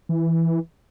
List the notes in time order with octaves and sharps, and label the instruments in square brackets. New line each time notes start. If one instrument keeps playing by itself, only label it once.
[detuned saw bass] E3